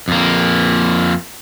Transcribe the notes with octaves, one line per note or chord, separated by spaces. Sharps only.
F2 A#3